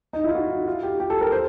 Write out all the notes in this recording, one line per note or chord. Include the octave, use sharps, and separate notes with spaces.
D#4
E4 F4
F#4
F4
G4
G4
A4
A#4
C5